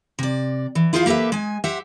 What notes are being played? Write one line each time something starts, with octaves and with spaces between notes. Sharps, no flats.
C3 D5
E3
E4 F4 G#4 C5 D5 F5
A#3 G4 A4 B4 E5
G#3 G#5
G4 C5 E5 F#5